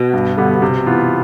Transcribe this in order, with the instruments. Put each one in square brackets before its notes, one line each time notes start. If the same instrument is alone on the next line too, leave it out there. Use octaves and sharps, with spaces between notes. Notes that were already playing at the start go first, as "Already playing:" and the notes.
Already playing: [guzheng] B2
[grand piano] G2
D3 G3 B3
C3
E3 B3 F4